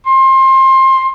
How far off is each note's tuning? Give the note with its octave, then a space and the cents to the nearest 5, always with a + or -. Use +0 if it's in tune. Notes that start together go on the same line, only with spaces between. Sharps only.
C6 +25